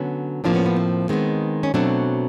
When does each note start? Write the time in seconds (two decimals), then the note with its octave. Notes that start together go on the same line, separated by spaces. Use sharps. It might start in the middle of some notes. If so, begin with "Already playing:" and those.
Already playing: D3 F#3 B3 C#4
0.44 A2 F3 A#3 C4 D4
0.55 B3 C#4
0.66 B3
0.76 C4
1.09 D#3 G#3 B3 C4
1.63 C#4
1.74 B2 F#3 A3 C4 D4